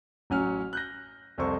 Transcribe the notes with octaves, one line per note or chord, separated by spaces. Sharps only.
A1 F#3 C#4 F6
F#6 G6 A#6
C2 F2 A4 C5 C#6